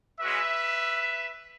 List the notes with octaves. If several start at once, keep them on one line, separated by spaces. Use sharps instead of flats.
G#3 C#4 F#4 B4 E5